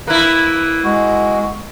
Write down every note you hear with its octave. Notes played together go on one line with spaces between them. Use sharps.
A#3 E4 B4
G#3 F#4